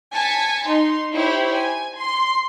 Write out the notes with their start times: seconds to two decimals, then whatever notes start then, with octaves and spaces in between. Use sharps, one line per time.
0.13 G#5 A5 B6 C#7
0.66 D#4 C6
1.12 E4 G4 C5 C#5
1.54 G#5
1.98 C6